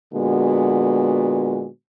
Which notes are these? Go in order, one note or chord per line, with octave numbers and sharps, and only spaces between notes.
A#2 D3 G#3 B3 F#4